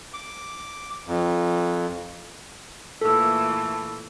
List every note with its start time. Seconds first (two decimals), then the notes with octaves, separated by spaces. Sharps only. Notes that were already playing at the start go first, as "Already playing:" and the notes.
0.14 D6
1.07 F2
3.01 A#2 E3 A3 A4 E6